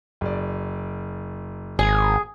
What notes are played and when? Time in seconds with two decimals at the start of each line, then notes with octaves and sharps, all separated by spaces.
0.21 F#1 D5
1.79 G#1 G#4